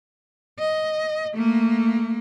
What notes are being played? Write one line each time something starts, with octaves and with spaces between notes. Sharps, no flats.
D#5
A3 A#3